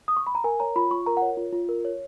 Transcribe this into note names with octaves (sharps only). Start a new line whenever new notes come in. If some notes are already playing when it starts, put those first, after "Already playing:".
D#6
C#6
B5
A#5
A#4 G#5
C#5 A#5
F4 B5
F4 C#6
A#4 A#5
F#5
C#5
F4
F4
A#4
C#5